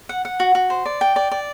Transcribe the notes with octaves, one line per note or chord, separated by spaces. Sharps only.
F#5
F#5
F#4
F#4
C5
D5
G5
D5
D5